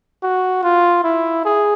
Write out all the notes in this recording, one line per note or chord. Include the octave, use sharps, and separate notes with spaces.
F#4
F4
E4
G#4